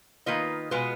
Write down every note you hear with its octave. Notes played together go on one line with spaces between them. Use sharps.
D#3 A#3 F4 B4 D#5
B2 G#3 B3 F4 B4